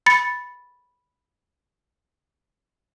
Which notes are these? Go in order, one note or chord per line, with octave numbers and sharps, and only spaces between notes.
B5 A6 C#7